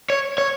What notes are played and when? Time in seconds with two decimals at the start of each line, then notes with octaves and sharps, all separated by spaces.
0.10 C#5
0.38 C#5